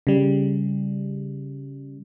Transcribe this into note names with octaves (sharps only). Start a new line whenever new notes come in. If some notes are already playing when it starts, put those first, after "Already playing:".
C#3 G3